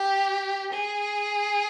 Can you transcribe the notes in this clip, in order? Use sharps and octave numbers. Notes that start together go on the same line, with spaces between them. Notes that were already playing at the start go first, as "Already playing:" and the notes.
Already playing: G4
G#4